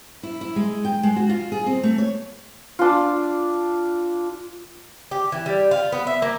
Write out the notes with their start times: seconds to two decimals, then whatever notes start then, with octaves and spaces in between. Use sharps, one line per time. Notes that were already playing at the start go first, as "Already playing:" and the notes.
0.23 E4
0.41 E4
0.56 G#3
0.85 G5
1.03 G#3
1.16 F#4
1.29 F4
1.52 G#4
1.66 C4
1.83 A3
1.98 C#5
2.79 D4 F4
5.11 G4
5.32 E3
5.46 G3
5.71 F4
5.92 B3
6.07 E5
6.22 A#3